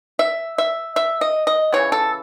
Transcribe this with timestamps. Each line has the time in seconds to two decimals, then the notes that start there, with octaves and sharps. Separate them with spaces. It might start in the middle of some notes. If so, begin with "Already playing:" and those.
0.19 E5
0.58 E5
0.96 E5
1.21 D#5
1.47 D#5
1.73 C#3 E3 B3 C#5
1.92 A4